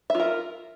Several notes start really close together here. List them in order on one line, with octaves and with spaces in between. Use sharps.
E5 F4 A#4